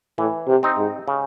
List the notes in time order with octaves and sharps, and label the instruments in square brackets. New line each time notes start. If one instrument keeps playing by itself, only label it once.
[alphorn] A2 [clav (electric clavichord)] E3
[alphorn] C3
[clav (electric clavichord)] C4 D#4
[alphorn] G#2
[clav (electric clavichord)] C#3